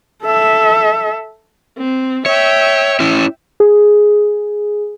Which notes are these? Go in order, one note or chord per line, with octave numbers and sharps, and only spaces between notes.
A4 E5
C4
C#5 E5 G5
C#4 E4 C#5
G#4